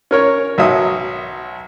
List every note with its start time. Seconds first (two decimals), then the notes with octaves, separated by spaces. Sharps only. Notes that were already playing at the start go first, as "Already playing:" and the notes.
0.11 C#4 A#4 C#5
0.58 B1 F#3 E5 D#6